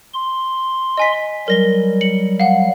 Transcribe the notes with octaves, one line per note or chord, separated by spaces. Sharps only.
C6
D#5 G#5 B6
F#3 G3 A#4 A#6 G7
C#7 F#7
F5 F#5